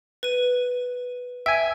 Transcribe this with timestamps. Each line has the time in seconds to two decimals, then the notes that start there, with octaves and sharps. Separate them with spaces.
0.23 B4 D#7
1.46 E5 G5 G#5